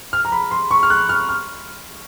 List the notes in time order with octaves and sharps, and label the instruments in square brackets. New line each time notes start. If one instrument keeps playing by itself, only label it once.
[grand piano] F6
A#5
B5
C6
C#6
F6
F#6
F6
F6